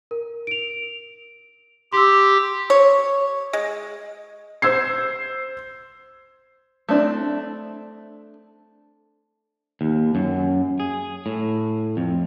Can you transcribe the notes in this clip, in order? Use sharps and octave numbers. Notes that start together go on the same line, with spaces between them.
A#4
D7 F7
G4 C6 E6
C#5
G#3
C5 E6 G#6 C7
A3 C4 D4 E4
D#2
F#2
G#4
A2
F2